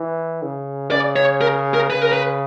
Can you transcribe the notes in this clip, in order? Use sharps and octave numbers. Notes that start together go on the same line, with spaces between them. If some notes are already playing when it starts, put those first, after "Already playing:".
Already playing: E3
C#3
C#3 D5
C#5
A#4
A#4
C#3 B4
A#4
B4